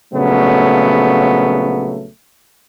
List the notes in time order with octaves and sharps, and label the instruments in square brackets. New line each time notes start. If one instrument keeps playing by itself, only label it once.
[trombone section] A#1 C#3 F#3 A3 B3